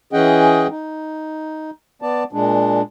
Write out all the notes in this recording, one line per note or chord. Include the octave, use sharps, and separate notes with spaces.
E3 C#4 G#4 D#5 F#5 G5
D#4
B3 D5 A5
A#2 G#3 D4